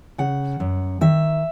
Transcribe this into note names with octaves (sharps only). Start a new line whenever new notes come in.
C#3 F#5
F#2
D#3 E5